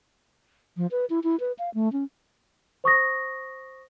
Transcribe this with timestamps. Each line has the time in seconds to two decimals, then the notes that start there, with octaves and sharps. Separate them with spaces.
0.77 F3
0.91 B4
1.10 E4
1.24 E4
1.40 B4
1.59 F5
1.74 A3
1.93 C#4
2.84 C5 C#6 D#6 A#6